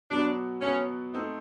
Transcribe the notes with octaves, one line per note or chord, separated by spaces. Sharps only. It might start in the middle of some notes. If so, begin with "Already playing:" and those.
B2 F#3 B3 D4
B2 F#3 B3 C#4
A3 C4 D#4